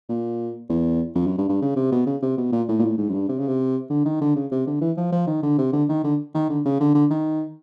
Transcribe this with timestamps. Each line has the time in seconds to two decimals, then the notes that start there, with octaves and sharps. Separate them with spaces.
0.09 A#2
0.69 E2
1.15 F2
1.27 F#2
1.38 G2
1.49 G2
1.62 C#3
1.76 C3
1.92 B2
2.06 C#3
2.22 C3
2.37 B2
2.52 A#2
2.68 A2
2.79 A#2
2.83 A2
2.98 G#2
3.09 F#2
3.14 G2
3.29 C3
3.38 C#3
3.48 C3
3.90 D3
4.05 D#3
4.21 D3
4.36 C#3
4.51 C3
4.67 D3
4.81 E3
4.97 F3
5.12 F3
5.27 D#3
5.43 D3
5.58 C3
5.73 D3
5.89 D#3
6.04 D3
6.34 D#3
6.49 D3
6.65 C#3
6.80 D3
6.95 D3
7.10 D#3